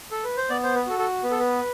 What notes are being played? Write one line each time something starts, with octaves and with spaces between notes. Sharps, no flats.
A4
B4
C5
B3 D5
C5
B4
F#4 A4
A4
B3 B4
A4
B4